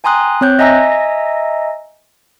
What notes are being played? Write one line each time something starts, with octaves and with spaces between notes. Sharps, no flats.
G5 G#5 A#5 C6 D#6 F#6
C4 C#5 F#6 G6
D#5 E5 G#5 A#5 E6 A#6